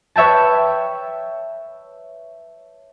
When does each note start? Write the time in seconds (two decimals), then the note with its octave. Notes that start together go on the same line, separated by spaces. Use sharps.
0.16 B4 C#5 E5 G5 A5